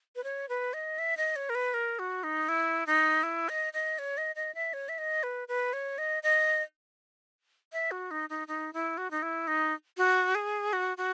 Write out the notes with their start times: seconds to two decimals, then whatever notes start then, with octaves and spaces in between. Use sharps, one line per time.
0.16 B4
0.24 C#5
0.49 B4
0.73 D#5
0.98 E5
1.17 D#5
1.36 C#5
1.49 A#4
1.55 B4
1.74 A#4
1.99 F#4
2.23 D#4
2.49 E4
2.86 D#4
3.23 E4
3.49 D#5
3.73 D#5
3.99 C#5
4.17 D#5
4.36 D#5
4.54 E5
4.73 C#5
4.89 E5
4.98 D#5
5.23 B4
5.48 B4
5.73 C#5
5.98 D#5
6.23 D#5
7.72 E5
7.91 F#4
8.11 D#4
8.29 D#4
8.48 D#4
8.73 E4
8.97 F#4
9.11 D#4
9.22 E4
9.47 D#4
9.97 F#4
10.35 G#4
10.73 F#4
10.97 F#4